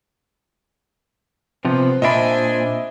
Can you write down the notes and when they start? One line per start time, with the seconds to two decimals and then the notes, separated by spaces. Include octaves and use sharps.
1.65 C3 F3 B3 C4 B4
2.02 A#2 D4 C5 D#5 E5 G#5 B5